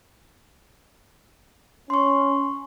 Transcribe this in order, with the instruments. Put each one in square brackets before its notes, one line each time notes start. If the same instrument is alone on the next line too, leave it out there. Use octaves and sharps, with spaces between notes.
[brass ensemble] C#4 [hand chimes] C6 C#6